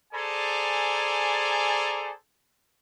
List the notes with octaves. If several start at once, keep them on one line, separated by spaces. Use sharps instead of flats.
G#4 A4 C5 D5 G#5 A#5